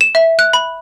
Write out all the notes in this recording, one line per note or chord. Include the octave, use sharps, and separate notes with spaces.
E7
E5
F#6
B5